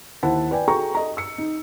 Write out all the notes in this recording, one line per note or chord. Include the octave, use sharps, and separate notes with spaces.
D#2 E4 C5 F#5 A5
B4 D5 G5 G#5
F#4 G#4 A4 G5 A#5 C#6
A4 D#5 A#5
E6 C#7
D#4